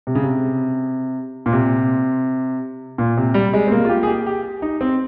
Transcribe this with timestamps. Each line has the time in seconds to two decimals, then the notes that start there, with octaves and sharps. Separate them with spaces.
0.07 C3
0.15 C#3
0.24 C3
1.46 A#2
1.52 C3
2.98 A#2
3.17 C3
3.34 G3
3.53 G#3
3.67 C4
3.72 A#3
3.85 F4
3.89 G4
4.03 G#4
4.07 G4
4.26 G4
4.62 D#4
4.81 C4